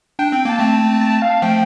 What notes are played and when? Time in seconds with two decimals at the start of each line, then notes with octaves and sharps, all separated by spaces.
0.19 D4 G5
0.32 C4
0.45 A#3 A5
0.59 A3 C4
0.81 A5
1.01 A5
1.22 F5
1.42 F3 A3 G5